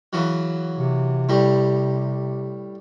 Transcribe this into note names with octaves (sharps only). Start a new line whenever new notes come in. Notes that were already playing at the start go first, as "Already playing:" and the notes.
C#3 E3 F#3
C3
A2 G3